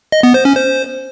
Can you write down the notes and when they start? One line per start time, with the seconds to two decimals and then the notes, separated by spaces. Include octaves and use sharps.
0.12 D#5
0.23 B3
0.34 C5
0.45 C#4
0.56 C5